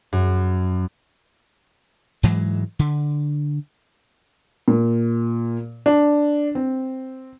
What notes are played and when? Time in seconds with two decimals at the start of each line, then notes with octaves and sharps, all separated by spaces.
0.13 F#2
2.23 G#2 E3 F#3 G#3
2.79 D3
4.68 A#2
5.86 D4
6.55 C4